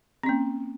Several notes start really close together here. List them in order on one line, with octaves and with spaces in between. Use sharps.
C4 C#4 A#3